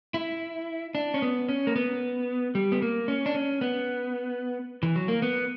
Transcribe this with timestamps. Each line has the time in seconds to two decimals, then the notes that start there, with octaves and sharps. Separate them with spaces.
0.14 E4
0.95 D4
1.14 C#4
1.22 B3
1.49 C#4
1.67 A#3
1.76 B3
2.55 G3
2.72 B3
2.82 A#3
3.08 C#4
3.26 D4
3.35 C#4
3.61 B3
4.83 E3
4.96 F#3
5.08 A#3
5.22 B3